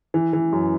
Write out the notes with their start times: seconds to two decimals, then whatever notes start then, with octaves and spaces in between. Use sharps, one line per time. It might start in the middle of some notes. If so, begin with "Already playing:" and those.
0.14 E3
0.33 E3
0.52 F#2